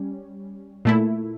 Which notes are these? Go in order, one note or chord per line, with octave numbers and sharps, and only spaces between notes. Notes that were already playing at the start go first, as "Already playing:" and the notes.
Already playing: G3 C#4
A#2 A3 E4